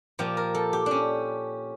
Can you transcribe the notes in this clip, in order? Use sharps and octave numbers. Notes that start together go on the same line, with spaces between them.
A#2 F3 G4
A#4
A4
G4
C#4 D4